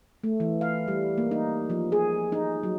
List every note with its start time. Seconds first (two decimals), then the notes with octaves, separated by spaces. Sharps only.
0.24 A3
0.40 E3
0.61 F5
0.88 G3
1.18 A#3
1.31 D#4
1.70 F3
1.92 G#4
2.32 D#4
2.63 F#3